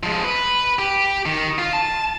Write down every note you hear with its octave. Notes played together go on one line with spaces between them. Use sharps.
F3 G#3
B4
G4
D#3
F4
A5